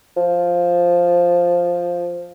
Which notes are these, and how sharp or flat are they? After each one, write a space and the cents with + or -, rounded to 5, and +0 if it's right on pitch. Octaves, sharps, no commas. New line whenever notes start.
F3 +0